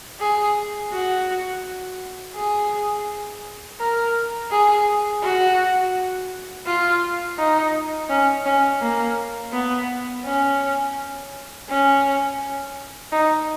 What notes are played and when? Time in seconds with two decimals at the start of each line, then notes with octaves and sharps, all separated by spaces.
0.20 G#4
0.92 F#4
2.35 G#4
3.79 A#4
4.51 G#4
5.23 F#4
6.66 F4
7.38 D#4
8.09 C#4
8.46 C#4
8.81 A#3
9.53 B3
10.25 C#4
11.69 C#4
13.12 D#4